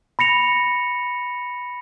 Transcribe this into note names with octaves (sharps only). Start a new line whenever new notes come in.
B5 A#6 C#7 F7